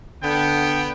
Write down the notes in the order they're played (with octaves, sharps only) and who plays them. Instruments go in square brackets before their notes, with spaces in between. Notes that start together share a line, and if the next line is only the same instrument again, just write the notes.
[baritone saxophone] D3 [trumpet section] B3 G5